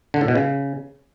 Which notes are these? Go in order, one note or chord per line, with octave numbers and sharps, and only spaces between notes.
D3
A2
B2
C#3